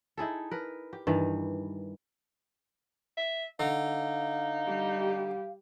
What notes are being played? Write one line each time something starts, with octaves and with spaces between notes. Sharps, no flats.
D#4 E4 G#4 A4
A#4 B4
G4
G2 D#3 E3
E5
D3 D#4 F5
G3 G4